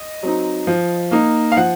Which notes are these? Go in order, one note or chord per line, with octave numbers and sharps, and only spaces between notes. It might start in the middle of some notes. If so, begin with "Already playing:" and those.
Already playing: D#5
F#3 C4 D#4
F3
A#3 D#4
F5
F3 F#5